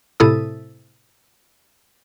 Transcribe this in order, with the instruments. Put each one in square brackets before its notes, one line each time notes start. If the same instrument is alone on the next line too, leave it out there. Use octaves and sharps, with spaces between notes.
[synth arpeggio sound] A2 C3 E4 A4 D#6